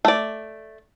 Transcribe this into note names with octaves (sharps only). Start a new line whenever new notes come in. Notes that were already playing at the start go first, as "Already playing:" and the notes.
A3 D5